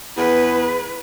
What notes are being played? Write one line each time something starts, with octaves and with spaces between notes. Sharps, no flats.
E2 B4